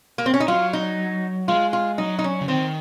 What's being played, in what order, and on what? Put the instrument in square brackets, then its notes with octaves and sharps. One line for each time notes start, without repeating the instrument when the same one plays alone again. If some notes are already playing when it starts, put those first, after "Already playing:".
[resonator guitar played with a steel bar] A#3
C4
C#4
D#4
[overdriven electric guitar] F#3 [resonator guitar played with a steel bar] F4
[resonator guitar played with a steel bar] D#4
[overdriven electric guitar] G#3 [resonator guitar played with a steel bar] F4
[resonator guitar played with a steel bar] F4
[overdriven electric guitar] F#3 [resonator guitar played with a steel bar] D#4
[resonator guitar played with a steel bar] D#4
C#4
[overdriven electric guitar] C#3
[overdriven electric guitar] D#3 [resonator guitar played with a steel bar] C4